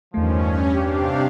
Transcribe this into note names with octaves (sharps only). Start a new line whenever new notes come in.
E2 G2 D#3 F3 A3 C#4
C3 D4 G4 F5